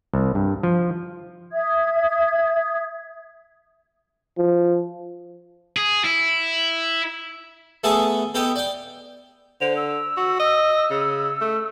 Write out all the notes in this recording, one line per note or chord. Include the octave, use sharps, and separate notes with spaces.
C2
G2
F3
E5 D#6 G#6
F3
G#4
E4
A3 B3 G#4 A4 G#5 A5
B3 G4 A4 D#5
D5 G5
D3 C5
E6
F#4
D#5
C#3
A3